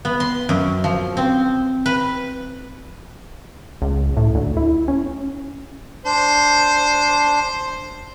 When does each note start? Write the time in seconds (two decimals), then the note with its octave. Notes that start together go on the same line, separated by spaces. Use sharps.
0.05 B3
0.20 C6
0.49 F#2
0.84 F3
1.17 C4
1.86 B4
3.82 C#2
4.17 A2
4.35 D2
4.57 E4
4.88 C#4
6.05 D4 C5